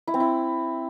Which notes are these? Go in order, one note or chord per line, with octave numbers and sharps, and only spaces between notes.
E4
C4
E4